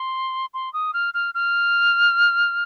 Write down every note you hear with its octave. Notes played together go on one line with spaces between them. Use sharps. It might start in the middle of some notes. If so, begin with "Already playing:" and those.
Already playing: C6
C6
D#6
F6
F6
F6